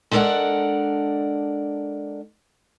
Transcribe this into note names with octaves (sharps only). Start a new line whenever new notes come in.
G#3 D4 A4 A#4 D5 F#5